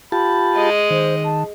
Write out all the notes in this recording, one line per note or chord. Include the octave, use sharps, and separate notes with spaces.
F4 G4 A5 B5
G#3 D#5
D#3 C5
A5